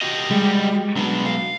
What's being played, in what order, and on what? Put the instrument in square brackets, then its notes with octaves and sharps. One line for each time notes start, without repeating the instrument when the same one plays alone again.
[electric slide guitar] F#4 G4 D#5
[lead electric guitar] G3 [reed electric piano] G#3
[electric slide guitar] F#3 B3 [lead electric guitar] D4
[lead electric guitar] F5